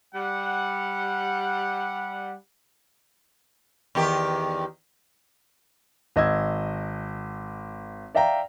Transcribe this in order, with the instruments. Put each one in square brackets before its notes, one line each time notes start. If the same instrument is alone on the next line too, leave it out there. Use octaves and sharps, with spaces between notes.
[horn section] G3 F#5
[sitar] E2 D#3 G4
[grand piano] G#1 D#5 E6 G#6
D5 E5 F5 G5 A#5